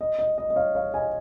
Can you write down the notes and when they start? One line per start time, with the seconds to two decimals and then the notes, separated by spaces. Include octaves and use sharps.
0.01 D#5
0.19 D#5
0.38 D#5
0.50 D#5
0.56 C#5 F5
0.75 C#5 F5
0.94 D#5 G#5